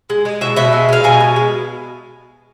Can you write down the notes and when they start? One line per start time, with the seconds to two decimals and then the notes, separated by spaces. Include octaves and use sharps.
0.10 G#3
0.25 G#3
0.41 B2 E5
0.56 B2 E5
0.73 G#3
0.89 G#3 F5
1.04 B2 G#5
1.20 B2
1.36 G#3